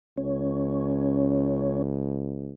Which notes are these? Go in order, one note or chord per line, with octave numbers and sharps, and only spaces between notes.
C#2 C#4